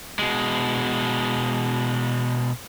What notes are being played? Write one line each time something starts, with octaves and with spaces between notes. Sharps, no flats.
B2 G#3